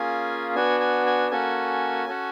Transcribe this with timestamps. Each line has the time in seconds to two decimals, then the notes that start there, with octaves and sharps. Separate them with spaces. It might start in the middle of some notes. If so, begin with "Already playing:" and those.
Already playing: A#3 C#4 F4 G#4 G#5
0.55 B3 D4 F#4 G#5
0.80 G#5
1.06 G#5
1.31 A#3 C#4 F#4 A4 G#5
2.08 C#4 F#4 A4